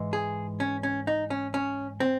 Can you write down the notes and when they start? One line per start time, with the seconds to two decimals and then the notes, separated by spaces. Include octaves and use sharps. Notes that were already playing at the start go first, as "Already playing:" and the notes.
Already playing: G#2 E3 G#3
0.13 G#4
0.60 C#4
0.83 C#4
1.07 D#4
1.30 C#4
1.54 C#4
2.00 C4